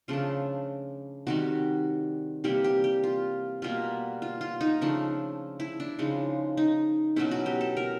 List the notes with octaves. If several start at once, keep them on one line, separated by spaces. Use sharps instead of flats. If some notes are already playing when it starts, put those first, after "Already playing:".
C#3 F3 A3 D4 F4
C3 D#3 G3 F#4
C3 E3 G3 A#3 G4
G4
G4
F4
B2 G3 A#3 F4
F4
F4
D#4
C#3 F3 A3 D4
E4
D4
C#3 F3 G#3 D#4
D#4
B2 F#3 A3 C#4 E4
F#4
G4
A4
A#4